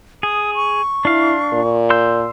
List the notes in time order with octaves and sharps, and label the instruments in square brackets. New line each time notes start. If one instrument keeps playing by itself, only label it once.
[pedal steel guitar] G#4 [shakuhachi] D#6
[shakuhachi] C#6
[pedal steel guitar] D4 F5 [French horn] E4
[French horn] A#2
[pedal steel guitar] C6 E6 G6